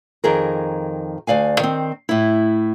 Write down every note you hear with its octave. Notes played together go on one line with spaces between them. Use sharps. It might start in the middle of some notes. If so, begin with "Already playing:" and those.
F2 D#3 G#4 A#4
D2 D5 F5 G#5
D#3 C4
A2 E4